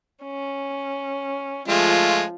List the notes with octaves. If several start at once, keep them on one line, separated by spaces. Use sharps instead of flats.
C#4
F3 G#3 A3 F4